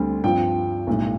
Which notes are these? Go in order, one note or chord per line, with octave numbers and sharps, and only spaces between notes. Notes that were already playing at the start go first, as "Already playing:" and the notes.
Already playing: D2 D3 G3 C4
G2 F3 C4 G5
B1 A2 G3